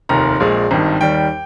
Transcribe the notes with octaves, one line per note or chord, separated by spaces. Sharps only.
F1 D#2 D#3 A#5
A#1 A#2 G#3
G#1 G2 D#3
D#2 D#3 G3 G5